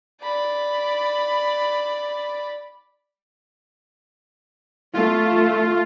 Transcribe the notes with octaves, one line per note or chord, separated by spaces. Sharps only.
D5 B5
A3 F4